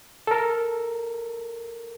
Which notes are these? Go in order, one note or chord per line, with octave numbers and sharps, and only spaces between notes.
A4 A#4